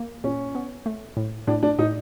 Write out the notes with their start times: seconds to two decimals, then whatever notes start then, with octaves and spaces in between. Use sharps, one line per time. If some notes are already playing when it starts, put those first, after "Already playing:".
Already playing: A#3
0.24 A#2 C#4
0.55 B3
0.86 A3
1.17 A2
1.47 A2 D4
1.63 D4
1.79 A2 D#4